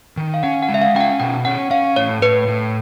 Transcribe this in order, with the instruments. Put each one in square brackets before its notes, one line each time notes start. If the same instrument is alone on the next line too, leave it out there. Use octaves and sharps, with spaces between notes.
[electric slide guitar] D#3
[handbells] F5
[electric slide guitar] C#4 [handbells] F#5
[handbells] F#5
[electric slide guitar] G#3
[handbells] E5
F5
[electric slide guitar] C#4 [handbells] G5
[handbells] F#5
[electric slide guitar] B2 [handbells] G5
[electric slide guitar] C#4 [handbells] F#5
[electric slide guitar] C#4 [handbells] F5
[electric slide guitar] A2 [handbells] C#5
[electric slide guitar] A2 [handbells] B4
[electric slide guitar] A2